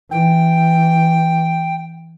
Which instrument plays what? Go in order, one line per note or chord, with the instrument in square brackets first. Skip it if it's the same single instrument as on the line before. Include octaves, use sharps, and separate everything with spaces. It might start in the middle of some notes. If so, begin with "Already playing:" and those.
[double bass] E3 [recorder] G5